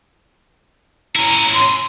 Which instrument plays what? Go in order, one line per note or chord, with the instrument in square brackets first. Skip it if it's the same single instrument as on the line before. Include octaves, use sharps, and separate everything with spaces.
[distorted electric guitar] C#4 E4 [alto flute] A#5
[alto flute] C6